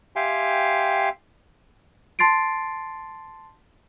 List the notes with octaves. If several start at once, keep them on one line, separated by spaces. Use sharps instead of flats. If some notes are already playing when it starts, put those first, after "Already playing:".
G4 E5 F5 G5 G#5 C6
A5 C6 A6 C7 D7